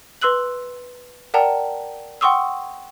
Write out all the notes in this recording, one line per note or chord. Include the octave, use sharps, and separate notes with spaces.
B4 C6 E6 F#6 F#7
A#4 D5 F#5 G5 A5 A#5
F#5 G5 C6 C#6 D#6 E6